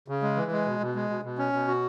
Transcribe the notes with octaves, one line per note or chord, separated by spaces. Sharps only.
C#3
G#3
E3
G#3
B2
B2
G#3
B2
B2
C#4
B2
F#4